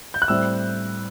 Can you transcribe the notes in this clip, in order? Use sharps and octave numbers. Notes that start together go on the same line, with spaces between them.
G6
F#6
A2 G3 C4 E4 E6